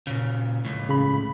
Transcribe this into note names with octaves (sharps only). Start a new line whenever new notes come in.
A#2 C#3
C#2 A2
C#3 B5